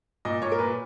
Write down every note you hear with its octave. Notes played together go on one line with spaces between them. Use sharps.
A#2 D#5
A#2 C#5
A#4
A#2 B4